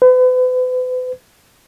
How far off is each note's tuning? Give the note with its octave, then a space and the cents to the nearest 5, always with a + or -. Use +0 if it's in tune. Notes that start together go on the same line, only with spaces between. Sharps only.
B4 +40